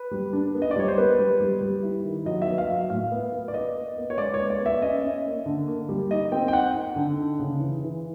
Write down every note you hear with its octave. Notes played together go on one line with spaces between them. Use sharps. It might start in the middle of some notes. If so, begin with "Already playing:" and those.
Already playing: B4
G3
D4
B3
D#5
D5
G3 C#5
C5
B3 B4
G3
G3
G3
E4
D#3
F#3 D#5
E5
B3
F5
F#3
A2 F5
B3
B3
D5
B3 D#5
B3
B3
C#5
G#3 D5
C#5
B3
D5
B3 E5
C#4 D#5
C#4
A#3
D3
A#3
G3
D#4 D#5
C4 G5
G5
D#4 F#5
D#4
D3
D#4
C#3
E3
E3